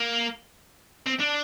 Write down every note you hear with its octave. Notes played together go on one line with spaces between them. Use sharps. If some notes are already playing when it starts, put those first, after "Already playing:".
Already playing: A#3
C4
D4